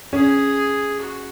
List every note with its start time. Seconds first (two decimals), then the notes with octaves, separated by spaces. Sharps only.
0.13 C#4 G#4
1.00 F#4